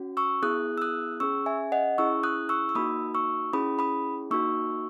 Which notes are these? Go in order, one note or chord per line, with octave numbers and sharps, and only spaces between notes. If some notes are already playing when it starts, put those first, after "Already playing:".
Already playing: C#4 F#4
C#6 E6
B3 E4 G#4 D#6 F#6
E6
D#6 F#6
C#4 G#4 C#6 E6
E5 G#5
D#5 F#5
C#4 E4 G#4 C#6 E6
D#6 F#6
C#6 E6
E6
A#3 D#4 F#4 B5 D#6
C#6 E6
C#4 E4 G#4 B5 D#6
B5 D#6
A#3 D#4 F#4 C#6 E6